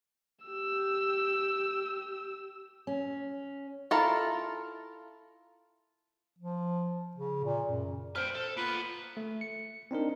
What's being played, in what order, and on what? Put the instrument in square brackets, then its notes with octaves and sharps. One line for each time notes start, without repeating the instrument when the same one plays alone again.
[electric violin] G4 E6
[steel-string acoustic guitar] C#4
[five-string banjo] E4 F4 A4 A#4 F5
[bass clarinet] F3
C#3
A#2
F#2
[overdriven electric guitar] B4 G5 [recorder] C5 [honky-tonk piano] F6
[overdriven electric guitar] A4
[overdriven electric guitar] A#3 B3 [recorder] F4 [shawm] B4
[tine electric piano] A3
C#7
C4 D4 D#4 A#4